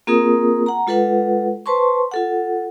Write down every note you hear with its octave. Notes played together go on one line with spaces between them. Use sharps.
A#3 C4 F4 G#4 A#4 D#6
F#5 A#5
G#3 F4 A4 B4 F#5
B4 C5 A5 C6 C#6
F4 A4 F#5